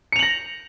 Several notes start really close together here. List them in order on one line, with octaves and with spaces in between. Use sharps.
C#7 F7 F#7 A#6